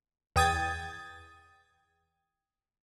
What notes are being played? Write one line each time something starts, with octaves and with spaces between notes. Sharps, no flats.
E2 G5 D#6 G#6 A6